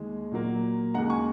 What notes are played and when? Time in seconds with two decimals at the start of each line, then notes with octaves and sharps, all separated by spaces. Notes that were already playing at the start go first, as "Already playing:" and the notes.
Already playing: D#2 D#3 G#3
0.31 A#2 F#3 A#3
0.94 D#2 C#3 G#3 F#5 A#5
1.10 G#5 C#6